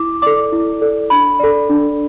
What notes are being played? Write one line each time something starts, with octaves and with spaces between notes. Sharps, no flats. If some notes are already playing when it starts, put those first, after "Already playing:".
Already playing: E4 D6
A4 D5 D6
E4
A4 D5
D4 B5
A4 D5
D4